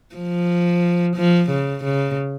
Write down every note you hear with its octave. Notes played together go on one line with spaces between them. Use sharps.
F3
F3
C#3
C#3